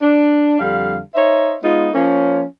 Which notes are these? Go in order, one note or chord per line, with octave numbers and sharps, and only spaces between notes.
D4
F2 D3 G3 F5
D#4 C5 C#5 D#5 E5
G#3 B3 D#4 F4
F3 A#3 C#4